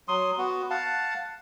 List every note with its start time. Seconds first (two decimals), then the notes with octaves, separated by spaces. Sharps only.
0.08 F#3 C6 D#6
0.38 B3 F#4
0.70 F5 F#5 A5